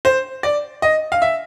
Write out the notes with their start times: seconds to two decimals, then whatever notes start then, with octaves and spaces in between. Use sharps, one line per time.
0.05 C5
0.43 D5
0.82 D#5
1.12 F5
1.22 E5